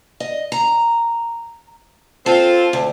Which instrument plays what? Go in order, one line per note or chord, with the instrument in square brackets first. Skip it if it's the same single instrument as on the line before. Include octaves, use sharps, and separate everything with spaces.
[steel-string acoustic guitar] D#5
A#5
[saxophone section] C4 F4 [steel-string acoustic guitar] A4
[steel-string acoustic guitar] D2